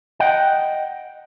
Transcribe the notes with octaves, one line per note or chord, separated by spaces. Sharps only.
D#5 F#5 G5